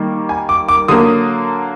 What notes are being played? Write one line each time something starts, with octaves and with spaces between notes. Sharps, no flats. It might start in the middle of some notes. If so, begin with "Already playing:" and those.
Already playing: D#3 G3 A#3
G#5
D6
D6
D3 F#3 A#3 D#6